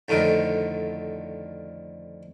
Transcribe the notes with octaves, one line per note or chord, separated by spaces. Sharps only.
F2 A2 D3 D#3